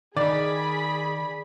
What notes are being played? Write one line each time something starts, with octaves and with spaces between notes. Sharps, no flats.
D#3 G#4 D5 B5